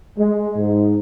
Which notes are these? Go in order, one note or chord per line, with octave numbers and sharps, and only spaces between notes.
G#3
G#2